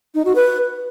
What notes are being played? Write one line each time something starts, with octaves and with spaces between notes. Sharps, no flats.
D#4
F#4
B4